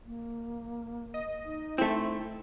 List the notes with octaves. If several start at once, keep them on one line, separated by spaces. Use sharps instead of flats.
A#3
D#5
D#4
A3 C4 E4